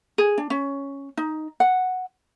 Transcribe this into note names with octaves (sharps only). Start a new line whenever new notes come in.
G#4
D4
C#4
D#4
F#5